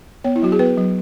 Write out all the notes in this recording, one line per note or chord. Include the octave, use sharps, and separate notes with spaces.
B3 C#5
E4
F#3 F#4
G#4
B3 B4
F#3